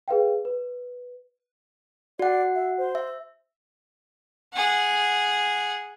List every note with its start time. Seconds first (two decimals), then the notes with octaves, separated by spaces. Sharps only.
0.08 G#4 B4 F5 G5
0.45 B4
2.19 F#4 D5 F#5
2.55 E5
2.78 C5
2.95 E5
4.54 G#4 F#5